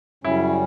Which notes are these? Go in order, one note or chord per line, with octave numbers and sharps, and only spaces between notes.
F#2 C#3 G3 C#4 E4